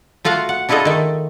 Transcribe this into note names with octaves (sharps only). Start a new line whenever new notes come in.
A3 F4 F#4 F5 F#5
F#5
D4 E4 F4 G#4 A4 D#5
D#3 A3